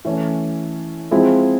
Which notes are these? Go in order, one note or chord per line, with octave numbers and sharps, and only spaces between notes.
E3 A3 C#4
F3 G#3 C4 E4